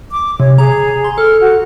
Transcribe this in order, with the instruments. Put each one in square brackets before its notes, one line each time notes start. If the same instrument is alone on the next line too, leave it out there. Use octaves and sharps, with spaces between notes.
[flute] D6
[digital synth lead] C3 [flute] C#5
[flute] G#4 [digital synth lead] A#5
[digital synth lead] C6
[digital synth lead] A4 [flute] F6
[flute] F#4